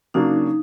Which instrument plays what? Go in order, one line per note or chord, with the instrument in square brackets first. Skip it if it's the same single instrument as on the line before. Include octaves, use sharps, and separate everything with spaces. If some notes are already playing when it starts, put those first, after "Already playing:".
[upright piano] C#3 F#3 A#3 D4 [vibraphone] D#4